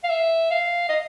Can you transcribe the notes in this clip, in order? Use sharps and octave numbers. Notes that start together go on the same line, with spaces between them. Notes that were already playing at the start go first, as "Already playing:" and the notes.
F5
E5
F5
D#5